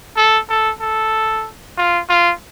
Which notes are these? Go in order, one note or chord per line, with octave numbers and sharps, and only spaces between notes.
A4
A4
A4
F4
F4